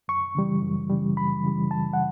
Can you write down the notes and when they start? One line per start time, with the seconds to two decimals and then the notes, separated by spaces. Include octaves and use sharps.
0.08 F#2 C#6
0.35 C#3 E3 G3
0.62 F#2
0.90 C#3 E3 G3
1.17 F#2 B5
1.44 C#3 E3 G3
1.71 F#2 A5
1.93 F#5